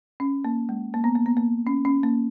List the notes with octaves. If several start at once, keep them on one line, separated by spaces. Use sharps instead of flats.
C#4
A#3
G#3
A#3
B3
A#3
B3
A#3
C#4
C#4
A#3